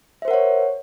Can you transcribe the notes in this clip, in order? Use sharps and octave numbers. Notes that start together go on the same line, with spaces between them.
A#4 C5 C#5 E5 F#5